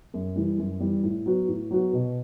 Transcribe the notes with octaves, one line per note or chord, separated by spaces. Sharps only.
F#2
E3 G3
F#2
E3 G3
A2
F#3 B3 F#4
A2
F#3 B3 F#4
B2